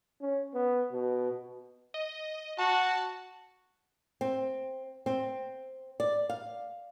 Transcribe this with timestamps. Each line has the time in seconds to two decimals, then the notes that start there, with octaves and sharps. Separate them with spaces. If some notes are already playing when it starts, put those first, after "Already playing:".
0.21 C#4
0.54 B3
0.92 B2
1.94 D#5
2.58 F#4 A5
4.21 C4
5.06 C4
6.00 D5
6.29 F5